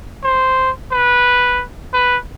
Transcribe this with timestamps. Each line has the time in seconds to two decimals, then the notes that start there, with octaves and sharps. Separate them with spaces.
0.23 C5
0.92 B4
1.93 B4